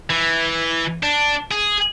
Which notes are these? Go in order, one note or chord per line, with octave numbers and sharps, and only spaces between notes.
E3
D4
G#4